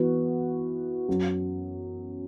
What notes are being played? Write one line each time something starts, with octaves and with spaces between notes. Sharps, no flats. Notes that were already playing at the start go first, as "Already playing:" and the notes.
Already playing: E3 B3 F#4 B4
F#2 F#3 C#4